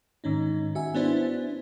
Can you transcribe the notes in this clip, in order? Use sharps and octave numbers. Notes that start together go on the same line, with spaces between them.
G#2 D#3 C#4 D#4
F#4 E5 G#5
B3 C#4 D4 E4 C5